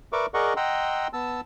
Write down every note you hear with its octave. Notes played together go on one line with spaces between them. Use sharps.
A#4 B4 D5 E5 C#6 D6
G#4 A#4 D5 D#5 F#5 C#6
D#5 F#5 G5 A#5 C6 E6
B3 A5 E6